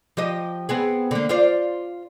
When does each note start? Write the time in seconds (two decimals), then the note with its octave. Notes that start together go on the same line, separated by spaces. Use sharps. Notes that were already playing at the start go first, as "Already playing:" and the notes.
0.17 F3 G4 D#5
0.69 B3 C4 G#4
1.11 D3 A#3
1.29 F4 C5 D5